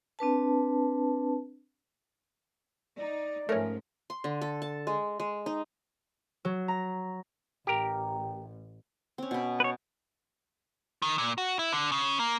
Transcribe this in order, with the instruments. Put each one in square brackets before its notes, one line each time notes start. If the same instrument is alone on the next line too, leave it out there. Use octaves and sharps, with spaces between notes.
[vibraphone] C4 D4 B4 A5
[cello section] D#4 [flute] D5
[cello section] G#2 F3 [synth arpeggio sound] A3 C#4 [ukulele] A#4
[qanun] C6
D3
A4
A5
G#3
G#3
D#4
[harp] F#3
A#5
[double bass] A1 [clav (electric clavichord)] G4 A#4
[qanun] C4 C#4
B2 B5
[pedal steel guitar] B4 C#5
[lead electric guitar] D#3
A#2
F#4
E4
D3
C#3
A#3